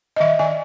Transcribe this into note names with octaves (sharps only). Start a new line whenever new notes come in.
D#5
D#3 E5
D#3 G#5